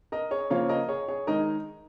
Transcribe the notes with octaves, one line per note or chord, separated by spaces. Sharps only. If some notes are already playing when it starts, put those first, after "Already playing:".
A#4 D#5
G#4 C#5
C#3 F3 A#3 C#4 F4 C#5 F5
A#4 D#5
G#4 C#5
G#4 C#5
D#3 G#3 D#4 A#4 D#5